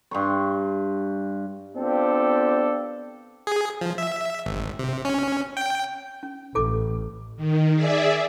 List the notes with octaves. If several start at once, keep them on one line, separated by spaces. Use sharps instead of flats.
G2 C6 C#6
B3 C4 D4 F4 G4 A4
G#4
F3
E5
G#1
C3
C#4
G5
C#4
A1 A4 D6
D#3
G#4 D5 E5